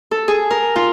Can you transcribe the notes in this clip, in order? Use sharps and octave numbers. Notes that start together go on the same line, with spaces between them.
A4
G#4
A#4
F4